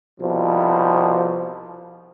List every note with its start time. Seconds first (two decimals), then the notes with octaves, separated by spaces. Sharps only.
0.20 C2 B2 F3